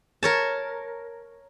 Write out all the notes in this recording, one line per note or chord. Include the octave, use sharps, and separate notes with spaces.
A#4 C#5 A5